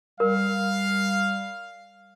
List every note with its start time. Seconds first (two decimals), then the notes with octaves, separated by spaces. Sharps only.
0.20 G3 A#4 F5